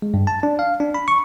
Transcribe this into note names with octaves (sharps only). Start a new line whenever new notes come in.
G#3
G2
A5
D4
F5
D4
B5
C#6